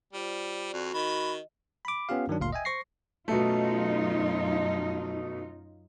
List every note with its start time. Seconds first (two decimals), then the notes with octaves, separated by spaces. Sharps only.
0.13 G3 F4 C5 D5
0.73 F2 F#4
0.94 D#3 D#5 B5
1.85 B5 D6
2.09 B3 C#4 F4 G4 F5
2.27 G2 D#3 F#3 D4
2.40 G1 D2 A#2 F5 C6
2.52 D#5 E5 G5 G#5
2.65 C5 C#6 A#6 C7
3.28 F#2 B2 A3 D#4 F4